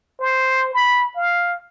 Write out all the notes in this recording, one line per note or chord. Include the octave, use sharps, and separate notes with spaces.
C5
B5
F5